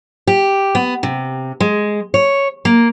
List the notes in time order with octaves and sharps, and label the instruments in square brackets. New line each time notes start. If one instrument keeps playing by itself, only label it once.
[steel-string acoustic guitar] G4
B3
C3
G#3
C#5
A#3